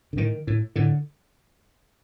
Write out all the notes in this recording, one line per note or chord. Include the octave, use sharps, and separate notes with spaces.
D3
A2 D#3
A2
A2 D3